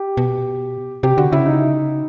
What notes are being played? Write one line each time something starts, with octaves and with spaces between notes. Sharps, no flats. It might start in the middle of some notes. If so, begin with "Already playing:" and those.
Already playing: G4
B2
C3 G4
D3 F#4
C#3 E4
D#4